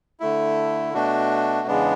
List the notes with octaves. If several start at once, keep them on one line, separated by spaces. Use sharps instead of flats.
D3 A3 E4
B2 A3 D4 F#4
E2 C#3 G#3 B3 D4